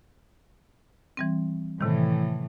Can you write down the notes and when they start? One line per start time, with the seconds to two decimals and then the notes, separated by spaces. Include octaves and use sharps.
1.17 E3 G3 C4
1.81 A2 C3 D#3 E3